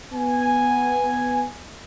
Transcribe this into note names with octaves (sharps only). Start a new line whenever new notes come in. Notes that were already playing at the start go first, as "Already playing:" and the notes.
B3 G#5